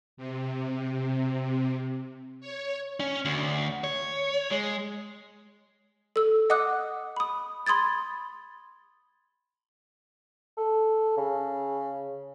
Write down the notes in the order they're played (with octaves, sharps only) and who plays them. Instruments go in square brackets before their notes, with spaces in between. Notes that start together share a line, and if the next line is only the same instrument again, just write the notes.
[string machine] C3
C#5
[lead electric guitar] C#4
D2
C#5
G#3
[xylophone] A4 E6
D#5 F#5 D6 D#6 F#6
B5 D#6
B5 C6 D#6 G#6 A6
[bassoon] A4
C#3